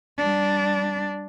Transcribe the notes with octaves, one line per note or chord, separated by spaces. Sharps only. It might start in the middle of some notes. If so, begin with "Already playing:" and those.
G3 D4